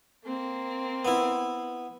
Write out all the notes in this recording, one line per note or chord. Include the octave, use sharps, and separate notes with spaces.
A#3 C4
B3 E4